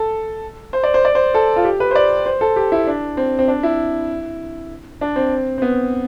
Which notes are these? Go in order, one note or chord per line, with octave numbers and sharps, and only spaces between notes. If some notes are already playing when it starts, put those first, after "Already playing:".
Already playing: A4
C5
D5
C5
D5
C5
A4
F4
G4
B4
C5
D5
C5
A4
G4
E4
D4
C4
C4
D4
E4
D4
C4
C4
B3